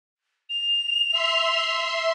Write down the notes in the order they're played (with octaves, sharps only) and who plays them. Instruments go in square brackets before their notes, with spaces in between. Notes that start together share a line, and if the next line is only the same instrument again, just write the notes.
[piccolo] F7
[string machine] E5 C6